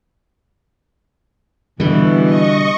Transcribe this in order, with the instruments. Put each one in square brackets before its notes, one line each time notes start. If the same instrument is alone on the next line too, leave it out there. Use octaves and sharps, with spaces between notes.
[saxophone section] B2 E3 [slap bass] D3 G3
[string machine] D#5 C#6